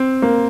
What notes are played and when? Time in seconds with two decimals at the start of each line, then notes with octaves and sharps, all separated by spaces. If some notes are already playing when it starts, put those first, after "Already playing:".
Already playing: C4
0.22 A#3